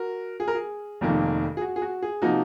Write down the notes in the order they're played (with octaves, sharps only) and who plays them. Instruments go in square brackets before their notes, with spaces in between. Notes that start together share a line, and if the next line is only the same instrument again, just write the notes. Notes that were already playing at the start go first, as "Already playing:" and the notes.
Already playing: [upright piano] F#4 A#4
G#4
A#4
G#4
F1 F2 D#3 A#3
G#4
F#4
G#4
F#4
G#4
C3 F3 A#3 D#4 F#4